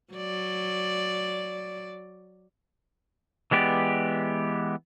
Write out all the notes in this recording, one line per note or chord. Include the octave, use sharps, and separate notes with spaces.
F#3 D5
E3 G#3 B3 G4 D5